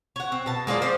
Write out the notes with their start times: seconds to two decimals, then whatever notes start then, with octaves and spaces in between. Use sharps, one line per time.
0.16 C#5 F#5
0.32 C4
0.46 B2 A5
0.67 G#3 A#3 F4 D5
0.82 F3 C4 C5